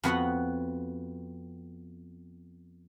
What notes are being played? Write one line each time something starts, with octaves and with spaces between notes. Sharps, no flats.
F2 B3 F#4 F#5